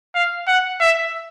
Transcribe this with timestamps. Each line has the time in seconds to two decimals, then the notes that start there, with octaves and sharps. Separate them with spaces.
0.15 F5
0.48 F#5
0.81 E5